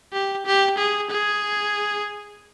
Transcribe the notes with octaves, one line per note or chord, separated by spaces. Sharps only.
G4
G4
G#4
G#4